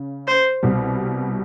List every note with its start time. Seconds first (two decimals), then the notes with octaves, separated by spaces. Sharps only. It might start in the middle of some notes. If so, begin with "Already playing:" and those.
Already playing: C#3
0.28 C5
0.63 C2 B2 G3